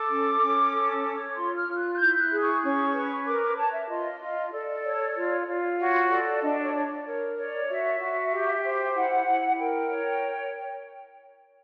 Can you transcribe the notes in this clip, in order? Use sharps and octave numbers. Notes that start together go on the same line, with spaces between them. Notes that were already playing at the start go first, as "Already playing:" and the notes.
Already playing: A4 D6
C#4
C#4
A4
C#5
F4 C6
F6
F4
F#6
F#6
E4 G6
F#6
G#4
C#6
C#4 C#6
B4
A#4 D6
D6
C#5 A5
E5
F4 D#5
F4
A4 D5
C#5
F4
F4
F#4 C#5
A4 D5
D4 D#5
D5
C#5
C#5
D5
A#4 C#5
C#5 D5
F#4 E5
F#4
G4
C5
E4 F#5
E4
A#4 G5
C#5